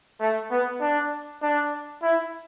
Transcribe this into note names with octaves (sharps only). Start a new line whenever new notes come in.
A3
B3
D4
D4
E4